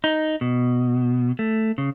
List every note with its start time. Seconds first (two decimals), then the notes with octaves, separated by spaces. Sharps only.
0.04 D#4
0.41 B2
1.39 A3
1.78 C#3